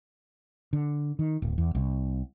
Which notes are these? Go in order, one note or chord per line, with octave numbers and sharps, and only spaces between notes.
D3
D#3
D1
E2
C2